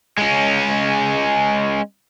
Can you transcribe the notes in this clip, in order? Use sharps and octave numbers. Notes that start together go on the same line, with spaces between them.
G#3 C#4